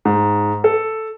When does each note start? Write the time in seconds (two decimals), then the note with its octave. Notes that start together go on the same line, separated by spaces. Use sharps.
0.05 G#2
0.64 A4